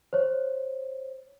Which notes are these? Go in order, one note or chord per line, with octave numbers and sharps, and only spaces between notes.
C5 C#5